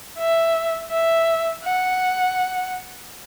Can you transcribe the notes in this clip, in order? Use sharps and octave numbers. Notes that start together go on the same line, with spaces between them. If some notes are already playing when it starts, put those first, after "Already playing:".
E5
E5
F#5